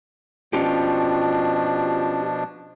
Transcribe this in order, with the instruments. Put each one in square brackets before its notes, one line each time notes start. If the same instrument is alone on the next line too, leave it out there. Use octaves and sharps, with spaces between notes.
[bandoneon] B2 F3 D4 [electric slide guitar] C#4 F4 G4